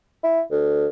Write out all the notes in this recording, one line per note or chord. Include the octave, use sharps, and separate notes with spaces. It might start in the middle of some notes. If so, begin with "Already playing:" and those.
E4
D2